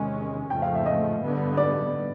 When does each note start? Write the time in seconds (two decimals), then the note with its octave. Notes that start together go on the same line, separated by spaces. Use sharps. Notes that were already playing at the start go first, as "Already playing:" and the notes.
Already playing: E2 C3 D#3 G#3 C#4
0.50 F2 C#3 F3 A3 G5
0.62 F5
0.75 E5
0.86 D#5
1.22 G2 D3 G3 B3
1.57 D5